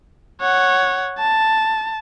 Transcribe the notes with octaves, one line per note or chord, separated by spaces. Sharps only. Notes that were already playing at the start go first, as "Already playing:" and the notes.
C#5 F#5
A5